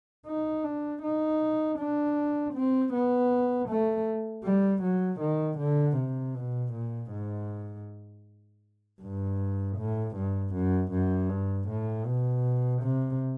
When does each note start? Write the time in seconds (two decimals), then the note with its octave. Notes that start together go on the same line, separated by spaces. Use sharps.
0.26 D#4
0.63 D4
1.02 D#4
1.78 D4
2.54 C4
2.93 B3
3.69 A3
4.44 G3
4.82 F#3
5.20 D#3
5.58 D3
5.97 C3
6.34 B2
6.73 A#2
7.11 G#2
9.01 G2
9.77 A2
10.16 G2
10.54 F#2
10.92 F#2
11.29 G2
11.68 A2
12.05 B2
12.82 C3